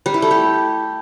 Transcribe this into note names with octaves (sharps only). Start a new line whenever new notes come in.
G3
E4
A3
G4